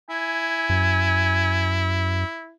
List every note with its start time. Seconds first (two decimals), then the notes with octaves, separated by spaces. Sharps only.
0.10 E4 G#5
0.69 F#2